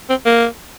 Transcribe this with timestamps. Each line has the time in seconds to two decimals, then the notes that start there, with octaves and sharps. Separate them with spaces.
0.10 C4
0.26 A#3